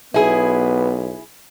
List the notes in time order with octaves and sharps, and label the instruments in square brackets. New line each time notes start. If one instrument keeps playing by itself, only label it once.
[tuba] B1 [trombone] B3 [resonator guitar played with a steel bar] E4 G#4